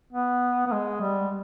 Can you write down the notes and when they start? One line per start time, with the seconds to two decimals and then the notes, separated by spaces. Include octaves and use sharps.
0.13 B3
0.67 B3
0.72 G#3
1.01 G3